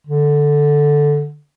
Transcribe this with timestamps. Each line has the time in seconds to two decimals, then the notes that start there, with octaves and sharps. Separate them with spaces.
0.07 D3